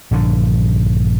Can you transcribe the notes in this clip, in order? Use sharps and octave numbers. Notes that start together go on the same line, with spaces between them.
A#1 G2 D3